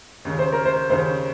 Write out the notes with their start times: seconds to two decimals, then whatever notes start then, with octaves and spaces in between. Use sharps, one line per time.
0.25 D#2 C#3
0.39 C5
0.52 A#4
0.65 C5
0.90 D#2 C#3 C5